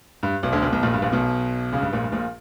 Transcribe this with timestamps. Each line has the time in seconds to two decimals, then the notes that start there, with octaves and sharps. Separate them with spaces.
0.23 G2
0.43 B1 B2
0.53 D2 D3
0.62 B1 B2
0.72 B1 B2
0.83 A#1 A#2
0.93 G2
1.02 A#1 A#2
1.13 B1 B2
1.72 C#2 C#3
1.82 G2
1.93 A#1 A#2
2.03 G2
2.12 A#1 A#2